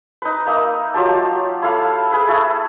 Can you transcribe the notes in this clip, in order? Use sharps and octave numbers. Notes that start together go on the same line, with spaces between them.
D#4 B4
A#3 D#4 E5
F#3 F4 G4 A5
E4 A4 F5 B5
G#4 B4
A3 E4 A4